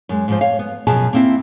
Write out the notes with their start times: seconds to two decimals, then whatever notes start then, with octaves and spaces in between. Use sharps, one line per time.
0.09 F#2 G#3
0.28 G#2 F3 C5
0.41 C#5 F5
0.59 B3
0.87 F#2 B2 F3 G#4 A5
1.13 A#3 C4 E4